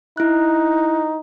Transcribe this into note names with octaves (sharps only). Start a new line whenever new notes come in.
D#4 E4 F#6